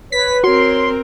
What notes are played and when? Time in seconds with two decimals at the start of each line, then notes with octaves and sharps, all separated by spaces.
0.12 B4 C#5 B6
0.44 C4 F#4 A#4 C#5 C6